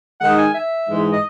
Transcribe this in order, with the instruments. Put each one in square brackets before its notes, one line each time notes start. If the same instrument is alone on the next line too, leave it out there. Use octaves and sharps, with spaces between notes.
[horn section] D#3 G#3 D#4 [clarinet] F#5
[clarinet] G#5
E5
[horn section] G#2 E3 G#3 D#4
[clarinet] D#5